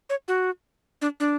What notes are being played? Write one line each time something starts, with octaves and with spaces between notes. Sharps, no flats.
C#5
F#4
D4
D4